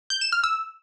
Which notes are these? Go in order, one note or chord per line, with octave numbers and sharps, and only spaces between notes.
G6
E7
F6
E6